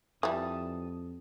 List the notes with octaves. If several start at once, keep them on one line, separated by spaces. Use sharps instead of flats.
F2 E3 G3 A5 D#6